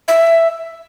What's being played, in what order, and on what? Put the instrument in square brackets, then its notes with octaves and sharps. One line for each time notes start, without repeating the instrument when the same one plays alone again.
[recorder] E5